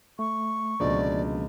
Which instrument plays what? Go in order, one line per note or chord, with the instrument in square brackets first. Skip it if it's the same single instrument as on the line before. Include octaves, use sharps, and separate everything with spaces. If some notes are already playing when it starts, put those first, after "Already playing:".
[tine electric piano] A3 [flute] C#6
[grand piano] C#2 B2 D3 [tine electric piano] F3 A#3 C#4 [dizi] D5